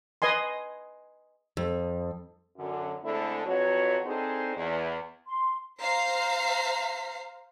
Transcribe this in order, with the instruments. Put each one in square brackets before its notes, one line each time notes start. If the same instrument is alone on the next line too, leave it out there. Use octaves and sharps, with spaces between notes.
[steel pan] B4 D#5 G#5 C6
[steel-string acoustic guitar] F2
[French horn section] F#2 D3
D3 G#3 A3 C4 E4 A4
F2 F#3 F#4 B4 C#5
C4 D4 D#4 G#4 A4 C5
E2
[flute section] C6
[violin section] C5 F5 A#5 C7